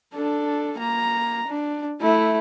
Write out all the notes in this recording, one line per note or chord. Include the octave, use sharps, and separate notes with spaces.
D4 A4
A#3 A#5
D4
A3 E4